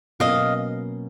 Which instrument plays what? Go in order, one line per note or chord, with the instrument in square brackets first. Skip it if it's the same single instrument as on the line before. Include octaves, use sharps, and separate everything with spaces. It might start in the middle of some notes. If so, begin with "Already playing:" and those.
[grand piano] B2 F#3 A#3 C#4 [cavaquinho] D#5 F5